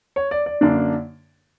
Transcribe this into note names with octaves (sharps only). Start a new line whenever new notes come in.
C#5
D5
D5
F#2 D3 A#3 D4 D5